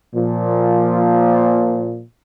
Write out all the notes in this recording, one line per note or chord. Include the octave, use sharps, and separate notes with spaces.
A#2 F3